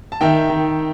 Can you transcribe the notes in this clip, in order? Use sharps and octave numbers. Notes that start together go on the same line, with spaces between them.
A5
D#3 E5 G5
D#3